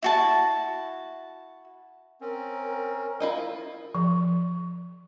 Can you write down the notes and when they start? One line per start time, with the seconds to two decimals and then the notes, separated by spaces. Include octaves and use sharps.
0.03 E4 F#4 A5
2.21 C4 C#4 A#4
3.20 E4 F4 D#5
3.95 F3